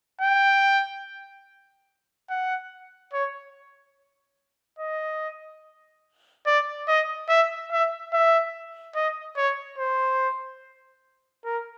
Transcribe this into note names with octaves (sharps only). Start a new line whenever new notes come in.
G5
F#5
C#5
D#5
D5
D#5
E5
E5
E5
D#5
C#5
C5
A#4